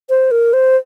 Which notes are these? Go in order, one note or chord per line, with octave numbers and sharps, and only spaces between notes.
C5
A#4
C5